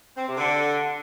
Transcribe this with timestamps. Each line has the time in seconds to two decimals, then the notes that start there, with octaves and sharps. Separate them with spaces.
0.17 C4
0.27 C3
0.36 D3